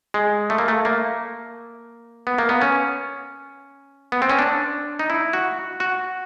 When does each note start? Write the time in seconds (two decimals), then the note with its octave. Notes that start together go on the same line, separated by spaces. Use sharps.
0.14 G#3
0.50 A3
0.58 A#3
0.68 A3
0.85 A#3
2.27 B3
2.38 A#3
2.49 B3
2.62 C#4
4.12 B3
4.22 C4
4.29 C#4
4.39 D4
4.99 D#4
5.10 E4
5.33 F#4
5.80 F#4